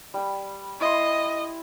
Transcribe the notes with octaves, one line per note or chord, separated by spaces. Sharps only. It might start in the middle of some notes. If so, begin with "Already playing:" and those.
G3 B5
E4 D#5 C6